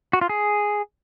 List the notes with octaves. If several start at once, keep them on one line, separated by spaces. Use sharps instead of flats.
F#4
F4
G#4